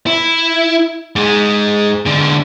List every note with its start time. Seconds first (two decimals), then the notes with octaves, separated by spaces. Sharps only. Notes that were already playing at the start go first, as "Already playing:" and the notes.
0.07 E4
1.16 G#2 G#3
2.06 G#2 D3